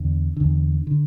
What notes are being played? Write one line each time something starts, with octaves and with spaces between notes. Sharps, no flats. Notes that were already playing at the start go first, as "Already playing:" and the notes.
Already playing: E2 D3
E2 D3
D3